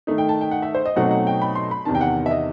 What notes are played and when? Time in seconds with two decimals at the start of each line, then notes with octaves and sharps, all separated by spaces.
0.07 D#3 A3 D#4
0.18 G5
0.29 A5
0.41 G5
0.51 F#5
0.62 E5
0.75 C5
0.86 D#5
0.96 B2 F#3 A3 C4 D#4 F#5
1.11 F#5
1.27 G5
1.42 B5
1.55 C6
1.71 B5
1.85 E2 C3 D#3 A5
1.95 G5
2.01 F#5
2.26 E5
2.31 D#5